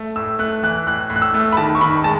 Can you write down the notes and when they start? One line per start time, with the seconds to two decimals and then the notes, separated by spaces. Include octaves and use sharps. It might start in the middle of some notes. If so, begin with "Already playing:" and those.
Already playing: A3
0.16 A2 E6
0.39 A3 F#6
0.63 E3 F#6
0.87 A2 F#6
1.10 A2
1.16 F#6
1.22 E6
1.34 A3
1.53 B5
1.57 D#3 A5
1.75 C#6
1.81 D#3 B5
2.04 G#3 A5